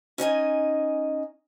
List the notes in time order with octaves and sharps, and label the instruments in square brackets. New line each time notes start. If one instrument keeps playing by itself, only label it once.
[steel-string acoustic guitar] C#4 D#4 D#5 G#5